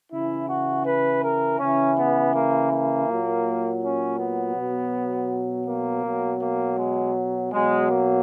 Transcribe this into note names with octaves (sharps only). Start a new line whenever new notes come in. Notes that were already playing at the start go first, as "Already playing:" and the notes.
C#3 E3 E4
F#4
B4
A#4
C#3 E3 C#4
B3
A#3
A#3
A#2 F#3
C#4
B3
B2 F#3
A#3
B2 F#3
A#3
G#3
B2 F#3 G#3
A#3